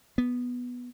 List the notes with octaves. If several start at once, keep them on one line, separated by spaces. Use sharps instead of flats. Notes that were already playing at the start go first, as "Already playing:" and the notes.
B3